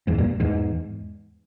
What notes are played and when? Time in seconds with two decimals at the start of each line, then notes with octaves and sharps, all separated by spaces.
0.07 E2 G#2
0.18 G2 A#2
0.40 E2 G#2